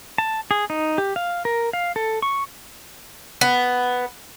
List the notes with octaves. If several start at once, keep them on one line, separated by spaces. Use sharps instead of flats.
A5
G#4
D#4
G4
F5
A#4
F5
A4
C#6
B3